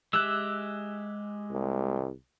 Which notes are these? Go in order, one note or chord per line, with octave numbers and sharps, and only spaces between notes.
G#3 G4 E5 E6 F#6
C2